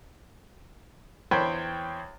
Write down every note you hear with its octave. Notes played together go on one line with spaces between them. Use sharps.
E2 C5 C#5 G5 B5